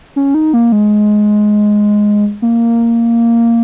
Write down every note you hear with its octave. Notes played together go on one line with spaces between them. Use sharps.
C#4
D#4
A#3
G#3
A#3